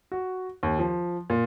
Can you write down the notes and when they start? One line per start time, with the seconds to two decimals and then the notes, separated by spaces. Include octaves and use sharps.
0.12 F#4
0.63 D#2
0.79 F3
1.30 A#2